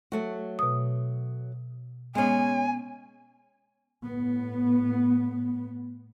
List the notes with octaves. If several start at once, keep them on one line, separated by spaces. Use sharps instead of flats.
F#3 A3 F#4
B2 D#6
G#3 B3 C#4 G#5
A2 B3